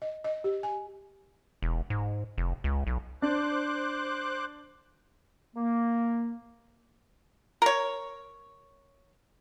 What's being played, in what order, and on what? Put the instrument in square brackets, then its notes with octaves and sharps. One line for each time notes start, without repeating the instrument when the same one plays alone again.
[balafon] D#5
D#5
G4
G#5
[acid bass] E1
G#2
F1
C#2
B1
[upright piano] D4 [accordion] C5 D6 F#6
[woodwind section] A#3
[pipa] A#4 C#5